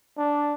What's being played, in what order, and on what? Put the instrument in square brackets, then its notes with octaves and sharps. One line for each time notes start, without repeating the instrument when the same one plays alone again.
[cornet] D4